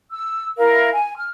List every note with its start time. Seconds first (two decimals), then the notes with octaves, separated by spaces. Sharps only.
0.12 E6
0.57 E4 A#4 F5
0.92 G#5
1.16 F6